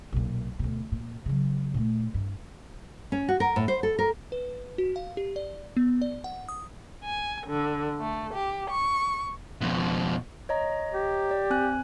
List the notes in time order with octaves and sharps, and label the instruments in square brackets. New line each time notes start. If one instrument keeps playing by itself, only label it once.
[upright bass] B1 A#2
D2 B2
A#2
C#3 F#3
A#2 A3
G2
[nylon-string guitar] C#4
F#4
A#4
A2
C5
A4
A#4
[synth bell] B4
F#4
F5
G4
D5
B3
D5
F#5
D#6
[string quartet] G#5
D3
A3
G4
C#6
[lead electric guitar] F2 B2
[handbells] C#5 D#5 A#5
[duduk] G4
[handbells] D5
C4 G#5 F#6